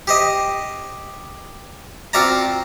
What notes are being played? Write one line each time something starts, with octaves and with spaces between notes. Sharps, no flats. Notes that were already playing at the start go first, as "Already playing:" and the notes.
G4 C5 D#5
C4 F4 F#4 D5 A5 A#5